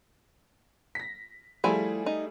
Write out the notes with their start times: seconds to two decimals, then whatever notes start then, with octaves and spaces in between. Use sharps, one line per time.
0.95 A#6 B6
1.64 F3 G3 A3 E4 G#4 G#5
2.06 D#4